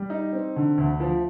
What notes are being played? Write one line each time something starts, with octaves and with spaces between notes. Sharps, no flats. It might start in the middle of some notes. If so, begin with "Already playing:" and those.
Already playing: G3
D#4
C4
D3
D2
F3